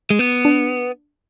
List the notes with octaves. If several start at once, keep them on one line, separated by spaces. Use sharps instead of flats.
G#3
B3
D4